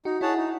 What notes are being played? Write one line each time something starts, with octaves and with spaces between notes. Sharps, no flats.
D#4 F#4
E4 G#4 C#5 F#5 A5
D#4